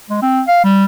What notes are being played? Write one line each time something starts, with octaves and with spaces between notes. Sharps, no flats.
G#3
C4
F5
G3